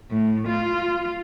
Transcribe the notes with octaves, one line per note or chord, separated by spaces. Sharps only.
A2
F4